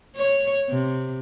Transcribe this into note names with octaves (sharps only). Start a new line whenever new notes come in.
C#5
C3